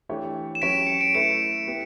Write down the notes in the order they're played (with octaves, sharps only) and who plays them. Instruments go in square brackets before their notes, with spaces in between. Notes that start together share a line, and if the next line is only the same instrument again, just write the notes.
[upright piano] E3 A3 D4 G4 C#5
[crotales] E7
[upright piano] F#3 C#4 G4 C#5 [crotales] B6 D7
[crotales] C#7
D7
[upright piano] A3 E4 B4 [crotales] C#7 E7
[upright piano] B3 E4 G4